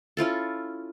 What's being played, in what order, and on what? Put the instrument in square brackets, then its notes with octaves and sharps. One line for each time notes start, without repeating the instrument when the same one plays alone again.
[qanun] C#4 E4 F4 A4